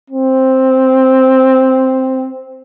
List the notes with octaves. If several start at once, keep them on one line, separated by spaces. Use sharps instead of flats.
C4